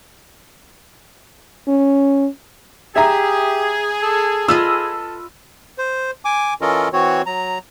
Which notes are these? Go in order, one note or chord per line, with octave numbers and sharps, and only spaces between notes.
C#4
G4 G#4 E5 A#5
A4
F4 A4 B4 D#5 E6
C5
G#5 D6
E3 C#4 F4 A4 A#4 D#5
E3 C4 F#4 C#5
F#3 A#5